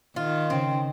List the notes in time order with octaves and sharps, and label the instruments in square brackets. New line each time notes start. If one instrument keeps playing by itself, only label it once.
[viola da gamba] D#3 [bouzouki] F4
[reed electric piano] C#3 C#4 [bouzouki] C4